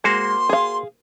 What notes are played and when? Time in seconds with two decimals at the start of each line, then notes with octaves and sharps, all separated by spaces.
0.04 G#3 A#3 F#4 C5 C6
0.49 G#4 F5